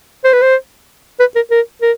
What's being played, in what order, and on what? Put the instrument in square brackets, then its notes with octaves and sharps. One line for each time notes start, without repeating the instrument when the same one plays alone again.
[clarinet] C5
B4
C5
B4
A#4
A#4
A#4